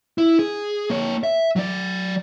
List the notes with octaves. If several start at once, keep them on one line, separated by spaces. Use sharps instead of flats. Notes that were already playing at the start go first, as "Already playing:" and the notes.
E4
G#4
A#3 C#5
E5
F#3 D5